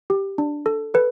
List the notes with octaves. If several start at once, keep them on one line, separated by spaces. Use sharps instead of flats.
G4
D4
A4
A4 B4